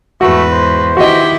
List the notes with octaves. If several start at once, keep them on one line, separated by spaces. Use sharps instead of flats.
E2 G#2 A3 F#4 B4
C5
D#3 E4 F#4 G4 D#5 G5